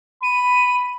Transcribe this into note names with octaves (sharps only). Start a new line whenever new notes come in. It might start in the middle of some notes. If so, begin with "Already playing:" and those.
B5 D#7